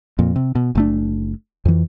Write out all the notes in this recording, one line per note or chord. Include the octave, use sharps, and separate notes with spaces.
F2 A#2
C3
B2
F#1 A3 D4
F2 E3